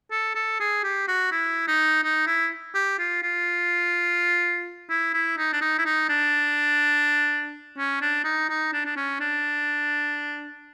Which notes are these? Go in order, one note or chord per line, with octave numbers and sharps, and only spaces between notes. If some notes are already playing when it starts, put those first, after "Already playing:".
A4
A4
G#4
G4
F#4
E4
D#4
D#4
E4
G4
F4
F4
E4
E4
D#4
D4
D#4
E4
D#4
D4
C#4
D4
D#4
D#4
D4
D4
C#4
D4